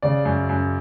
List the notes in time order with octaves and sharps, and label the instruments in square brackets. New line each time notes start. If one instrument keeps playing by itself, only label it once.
[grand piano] C#3 D5
F#2
F#2